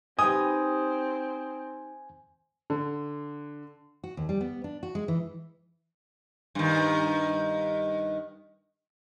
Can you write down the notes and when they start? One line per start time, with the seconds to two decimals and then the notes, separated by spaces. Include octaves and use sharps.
0.19 C4 D#4 G4 B4 G#5 D#6
2.70 D3
4.04 F#4
4.17 D#2
4.29 G3
4.41 B3
4.64 D4
4.83 F#4
4.95 G#3
5.08 E3
6.55 G2 D#3